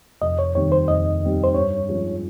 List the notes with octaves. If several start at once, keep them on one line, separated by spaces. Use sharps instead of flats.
F1 D#5
C#5
D#2 D#3 G3 C4 C#5
C5
F1 D#5
D#2 D#3 G3 C4
C5
G2 C#5
F3 G#3 C#4